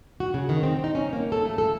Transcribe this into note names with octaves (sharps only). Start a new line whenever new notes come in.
F#4
C#3
D#3
C4
D#4
C#4
A#3
A4
A3
A4